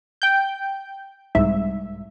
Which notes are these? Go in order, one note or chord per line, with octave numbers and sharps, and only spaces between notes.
G5 G6
C2 G#2 E5